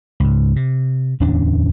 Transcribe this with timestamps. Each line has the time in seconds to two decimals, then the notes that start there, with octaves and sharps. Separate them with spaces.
0.20 C#2 G#2
0.56 C3
1.20 D1 E2 C#4 D4